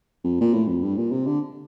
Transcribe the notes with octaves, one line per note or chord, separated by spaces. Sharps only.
F2
A#2
A2
F2
G2
A#2
C3
D3